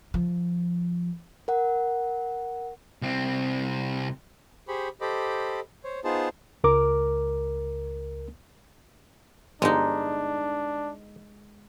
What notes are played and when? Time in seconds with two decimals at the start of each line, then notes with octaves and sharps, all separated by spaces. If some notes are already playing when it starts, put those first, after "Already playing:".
0.14 F3
1.48 A#4 F#5
3.02 C2 C4
4.68 G4 G#4 C5 B5 C#6
5.01 G4 A4 C5 D#5 B5 D6
5.84 C5 C#5
6.04 B3 D#4 F4 G#4 C5 A5
6.64 C#2 A#4 D6
9.62 G1 G#3 D4 D#4